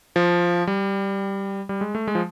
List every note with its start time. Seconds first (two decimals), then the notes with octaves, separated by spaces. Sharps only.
0.16 F3
0.67 G3
1.69 G3
1.81 G#3
1.95 A3
2.07 G#3
2.15 F3